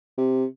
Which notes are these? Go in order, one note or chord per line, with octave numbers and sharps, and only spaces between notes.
C3